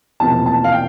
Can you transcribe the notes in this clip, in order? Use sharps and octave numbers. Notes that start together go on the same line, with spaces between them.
E1 E2 C3 F3 A#3 A5
A5
F5
G5